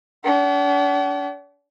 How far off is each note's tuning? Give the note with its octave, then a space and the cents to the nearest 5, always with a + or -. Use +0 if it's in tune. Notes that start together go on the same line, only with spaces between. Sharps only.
D4 -45 F#5 +45